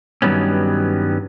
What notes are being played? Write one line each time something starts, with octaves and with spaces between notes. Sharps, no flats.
G2 D#3 F#3 G3 B3 C#4